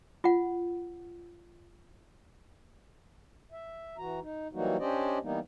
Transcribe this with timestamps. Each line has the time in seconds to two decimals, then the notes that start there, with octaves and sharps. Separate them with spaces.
0.24 F4 F#5
3.52 E5
3.98 E3 F#4 A#5
4.22 D#4
4.53 E3 F#3 G3 A#3 D#4 F#4
4.79 C#4 D4 G4 C5 D5 D#5
5.22 E3 G3 A#3 B3 D#4